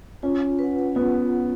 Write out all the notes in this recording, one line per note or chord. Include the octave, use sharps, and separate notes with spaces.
C#4 F4
B4 F#5
B3 F4